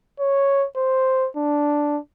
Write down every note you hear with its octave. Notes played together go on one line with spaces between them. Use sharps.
C#5
C5
D4